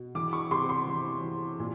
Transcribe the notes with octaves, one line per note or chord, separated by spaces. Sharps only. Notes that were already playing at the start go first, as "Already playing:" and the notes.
Already playing: B2
E3 D6
C#6
C3 C6
C6
E3
E3
A#2